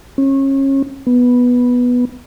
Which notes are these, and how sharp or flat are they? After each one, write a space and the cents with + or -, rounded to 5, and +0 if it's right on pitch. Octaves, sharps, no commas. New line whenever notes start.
C#4 -30
B3 -5